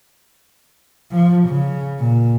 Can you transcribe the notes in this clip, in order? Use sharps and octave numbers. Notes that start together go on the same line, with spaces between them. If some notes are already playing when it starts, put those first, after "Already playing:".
F3
C#3
A#2